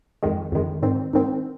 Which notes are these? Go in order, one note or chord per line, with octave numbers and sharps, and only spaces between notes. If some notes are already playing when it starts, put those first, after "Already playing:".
F2 D#3 G#3
F2 D#3 G#3
G#2 D#3 C4
G#2 D#3 C4